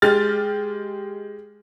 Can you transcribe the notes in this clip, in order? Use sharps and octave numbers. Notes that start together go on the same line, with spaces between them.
G#3 G4 F6 A6